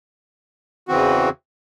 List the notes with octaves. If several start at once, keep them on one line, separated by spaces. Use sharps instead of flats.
E2 C#3 E3 C4 F#4